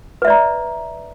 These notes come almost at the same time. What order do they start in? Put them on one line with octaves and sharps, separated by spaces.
B4 E5 D5 A#5